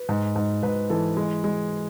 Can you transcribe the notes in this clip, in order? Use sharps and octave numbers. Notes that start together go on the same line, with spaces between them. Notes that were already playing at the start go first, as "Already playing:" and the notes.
Already playing: B4
G#2
G#2
G#2 B4
E3 A4
G#3
G#3